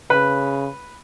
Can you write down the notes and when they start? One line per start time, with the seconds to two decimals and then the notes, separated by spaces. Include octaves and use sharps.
0.10 C#3 B4